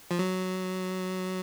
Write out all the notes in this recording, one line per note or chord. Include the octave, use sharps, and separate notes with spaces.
F3
F#3